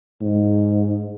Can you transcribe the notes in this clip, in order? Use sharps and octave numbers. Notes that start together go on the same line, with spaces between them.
G#2